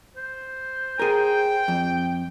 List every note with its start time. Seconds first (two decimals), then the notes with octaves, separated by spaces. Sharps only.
0.17 C5
0.99 G#4 A#4 G5
1.68 F2